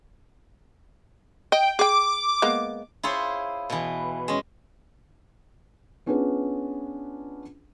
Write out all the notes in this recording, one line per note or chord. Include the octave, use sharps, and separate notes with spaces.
D#5 G5
G#4 G5 D6
G#3 A#3 B3
E4 F4 G#4 C5 C#5
B2 E3
G#3 C#4
B3 C#4 D4 F4 G#4 B4